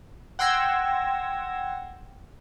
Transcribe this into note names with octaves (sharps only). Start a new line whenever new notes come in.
F#5 G5 C6 E6 G#6 A#6